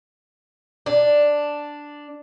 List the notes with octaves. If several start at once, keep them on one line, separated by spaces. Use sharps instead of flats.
D4